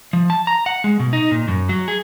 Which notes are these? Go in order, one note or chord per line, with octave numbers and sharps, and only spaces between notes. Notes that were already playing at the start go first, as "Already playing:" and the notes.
F3
A5
A#5
F#5
G#3
B2
D#4
A#2
F#2
F#3
G#4